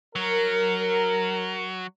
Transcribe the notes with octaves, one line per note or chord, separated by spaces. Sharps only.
F#3 A#4